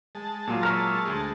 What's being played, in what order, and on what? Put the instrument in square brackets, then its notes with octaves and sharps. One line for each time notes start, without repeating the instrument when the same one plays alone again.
[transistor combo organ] G#3 A5
[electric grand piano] A#2 F#3 F4
[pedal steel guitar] A#4 C#5 E5
[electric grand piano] D2 G#4